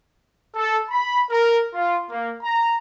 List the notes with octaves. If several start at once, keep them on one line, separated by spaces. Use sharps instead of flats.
A4
B5
A#4
F4
A#3
A#5